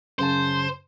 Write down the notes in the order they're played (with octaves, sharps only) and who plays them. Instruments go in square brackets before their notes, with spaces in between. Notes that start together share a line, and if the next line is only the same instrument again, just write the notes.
[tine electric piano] F#2 C#3 A5 [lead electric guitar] C5